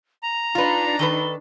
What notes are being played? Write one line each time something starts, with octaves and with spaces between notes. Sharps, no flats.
A#5 F7
D4 D#4 F4 B4
D#3 A4 B4 G7